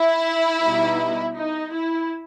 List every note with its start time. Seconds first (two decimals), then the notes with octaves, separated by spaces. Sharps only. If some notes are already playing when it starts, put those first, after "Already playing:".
Already playing: E4
0.63 B2 G3 B3 D#4
1.36 D#4
1.72 E4